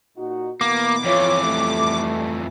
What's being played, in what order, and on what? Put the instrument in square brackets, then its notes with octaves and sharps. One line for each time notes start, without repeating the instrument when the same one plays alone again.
[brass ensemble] A#2 D#4 F#4
[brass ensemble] B2 E3 B3 [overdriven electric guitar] A#3 [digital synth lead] D6
[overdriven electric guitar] F2 E3 [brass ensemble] F4 C#5
[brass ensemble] G3 A3